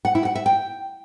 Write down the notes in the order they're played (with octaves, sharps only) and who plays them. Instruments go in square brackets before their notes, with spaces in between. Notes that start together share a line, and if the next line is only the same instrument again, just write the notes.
[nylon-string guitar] F#5
E4
F#5
E5
G5